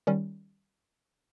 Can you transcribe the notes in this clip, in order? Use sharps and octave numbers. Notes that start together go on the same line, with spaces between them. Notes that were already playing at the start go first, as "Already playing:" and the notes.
D#3 G3 C#4